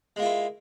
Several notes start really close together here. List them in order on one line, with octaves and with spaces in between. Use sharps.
G#3 A#3 F4 E4